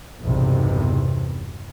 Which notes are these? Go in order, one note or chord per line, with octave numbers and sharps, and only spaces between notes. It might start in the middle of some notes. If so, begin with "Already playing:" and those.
B1 E2 G2 C3 D#3